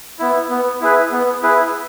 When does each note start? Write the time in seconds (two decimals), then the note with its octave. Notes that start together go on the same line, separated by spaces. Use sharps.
0.19 B3 E4
0.50 B3
0.81 E4 G#4 B4
1.12 B3
1.43 E4 G#4 B4